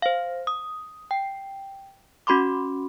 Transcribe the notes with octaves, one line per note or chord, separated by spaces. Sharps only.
C5 F5
D#6
G5
C#4 F#4 B5 C6 D6